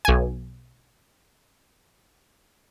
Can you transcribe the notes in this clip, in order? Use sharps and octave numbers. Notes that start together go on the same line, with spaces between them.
B1 G#5